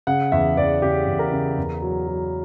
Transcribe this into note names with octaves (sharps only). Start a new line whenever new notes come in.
C#3 F#5
E2 E5
E2 D5
C#3 G4
E2
A#4
C#3
E2
F#3
F#3